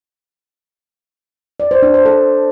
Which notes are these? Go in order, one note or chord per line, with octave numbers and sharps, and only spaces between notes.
D5
C5
D4
C5
A4